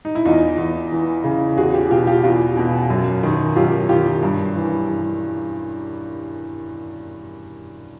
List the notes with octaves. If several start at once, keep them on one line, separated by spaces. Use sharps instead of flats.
D#4
E4
E2 D#4 F4
E2
E3
C#3
E2 F#4 G#4
F4 G4
B2 F4 G4
F4 G4
E2 F4 G4
B2
F#2
D#3
F#2 F4 G4
D#3 F4 G4
G2
E3
G2